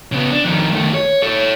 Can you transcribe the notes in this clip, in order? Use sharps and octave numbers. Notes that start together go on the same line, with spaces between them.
C#3 B3
D4
F2 D#3
D#3 A3
C#5
A4 C#5